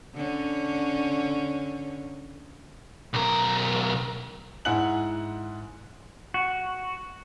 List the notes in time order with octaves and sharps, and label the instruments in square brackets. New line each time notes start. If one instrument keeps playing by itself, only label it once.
[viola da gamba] D3 C#4
[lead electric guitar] B1 A#4
[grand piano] G#2 E4 F#5 G#5 F#6 F#7
[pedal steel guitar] F#4